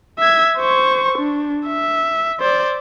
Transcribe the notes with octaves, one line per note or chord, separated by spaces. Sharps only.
E5 G#6
C5 C#6
D4
E5
C5 D5